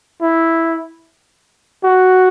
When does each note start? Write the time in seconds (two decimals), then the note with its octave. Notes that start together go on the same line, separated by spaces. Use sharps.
0.22 E4
1.84 F#4